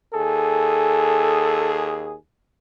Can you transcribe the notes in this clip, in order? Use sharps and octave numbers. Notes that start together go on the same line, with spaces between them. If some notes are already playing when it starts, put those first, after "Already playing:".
D#2 G#4 A4